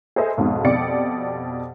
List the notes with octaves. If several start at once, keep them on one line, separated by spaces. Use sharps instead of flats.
G#4 A4 B4 C5 D#5 E5
B1 F2 G#2 B2
F2 B2 G4 D5 C#7